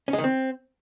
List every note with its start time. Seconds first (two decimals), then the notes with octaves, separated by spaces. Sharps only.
0.08 C#4
0.13 G#3
0.19 D#3
0.24 C4